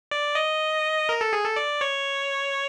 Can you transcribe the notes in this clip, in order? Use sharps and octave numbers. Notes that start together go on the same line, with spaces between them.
D5
D#5
A#4
A4
G#4
A4
D5
C#5